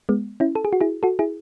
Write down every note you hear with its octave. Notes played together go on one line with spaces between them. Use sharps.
G#3 B3
C#4 E4
A4
G#4
F#4
E4 G#4
F#4 A4
E4 G#4